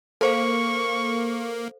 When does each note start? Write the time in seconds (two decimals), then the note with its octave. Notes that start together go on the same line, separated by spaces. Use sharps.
0.21 A#3 A4 C5 F5 C#6